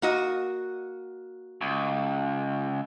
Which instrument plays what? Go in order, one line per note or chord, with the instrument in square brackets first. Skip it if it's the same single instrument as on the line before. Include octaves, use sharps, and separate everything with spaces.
[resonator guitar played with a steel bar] A#3 F#4 D#5
[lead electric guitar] C#2